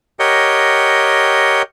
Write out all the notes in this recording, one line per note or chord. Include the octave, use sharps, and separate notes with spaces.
G4 A#4 C#5 D#5 F#5 G5